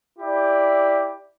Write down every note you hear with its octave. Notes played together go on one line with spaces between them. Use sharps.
E4 G4 D5